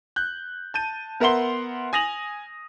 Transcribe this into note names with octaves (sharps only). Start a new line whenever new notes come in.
F#6 G6
A5 G6 D#7
B3 A#4 E5 F#5 C6 G7
G#5 D#6 A#6 F7 F#7